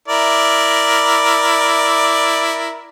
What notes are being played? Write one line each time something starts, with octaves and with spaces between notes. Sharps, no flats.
E4 A#4 D5